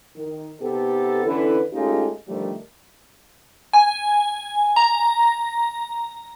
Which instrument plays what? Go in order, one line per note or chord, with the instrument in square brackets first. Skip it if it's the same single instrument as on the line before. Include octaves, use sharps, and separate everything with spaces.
[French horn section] D#3
C3 B3 D#4 G4 A4
D3 E3 C#4 E4 A4 B4
G#3 A3 C#4 D#4 F4 G4
D3 D#3 F3 G3 A3
[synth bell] G#5
A#5